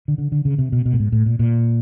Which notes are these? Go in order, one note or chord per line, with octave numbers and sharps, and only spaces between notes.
D3
D3
D3
C#3
C3
B2
B2
A2
G#2
A2
A#2
A#2